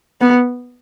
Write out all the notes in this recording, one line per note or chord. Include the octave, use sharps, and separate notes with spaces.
B3